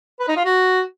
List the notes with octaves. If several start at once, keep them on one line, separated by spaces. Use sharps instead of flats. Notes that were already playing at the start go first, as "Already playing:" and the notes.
B4
D#4
F4
F#4